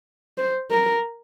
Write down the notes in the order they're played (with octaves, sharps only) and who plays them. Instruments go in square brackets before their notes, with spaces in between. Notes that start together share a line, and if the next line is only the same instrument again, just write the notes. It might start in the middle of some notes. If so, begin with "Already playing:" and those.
[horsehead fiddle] C5
A#4